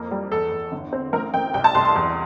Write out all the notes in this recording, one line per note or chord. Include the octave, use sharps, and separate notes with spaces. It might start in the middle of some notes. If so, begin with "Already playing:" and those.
Already playing: F2 A#3
G3
E2 A4
E2
G1
C4
A1 A#4
A1 G5
C2 G5
A5
C2 C6
C6
E2